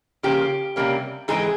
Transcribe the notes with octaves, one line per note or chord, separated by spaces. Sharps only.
C#3 F3 A#3 C#4 G4
C3 G3 A#3 C#4
G#2 E3 G#3 C4 G#4